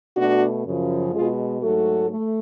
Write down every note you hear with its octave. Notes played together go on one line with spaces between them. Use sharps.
B2 A3 D4 F#4
F#2 C#3 F3
B2 G#3 F4 G#4
G#2 F#3 A3 F#4 A4
A3